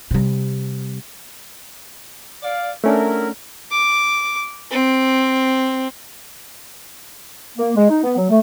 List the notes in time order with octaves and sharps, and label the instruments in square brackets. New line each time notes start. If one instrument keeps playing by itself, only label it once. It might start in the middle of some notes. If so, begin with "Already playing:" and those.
[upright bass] C3 G3
[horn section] D5 F5
[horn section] F#3 E4 A#4 [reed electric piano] A3 C#4 D4
[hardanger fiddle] D6
C4
[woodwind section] A#3
G#3
D#4
B3
F#3
A3